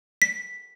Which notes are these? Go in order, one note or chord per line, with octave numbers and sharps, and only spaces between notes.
B6